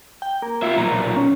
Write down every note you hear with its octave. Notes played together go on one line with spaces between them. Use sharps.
G5
A#3
F4 E5
B1 A#2 A#5
C#4